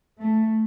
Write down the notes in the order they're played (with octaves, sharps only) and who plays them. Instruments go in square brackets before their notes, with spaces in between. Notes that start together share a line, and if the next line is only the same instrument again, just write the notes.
[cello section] A3